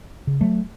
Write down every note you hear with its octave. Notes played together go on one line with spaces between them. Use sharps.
C#3
F#3 A3